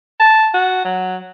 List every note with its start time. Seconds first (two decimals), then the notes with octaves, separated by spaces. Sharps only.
0.20 A5
0.54 F#4
0.85 F#3